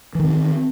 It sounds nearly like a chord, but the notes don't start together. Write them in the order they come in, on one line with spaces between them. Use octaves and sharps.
E3 D#3 C4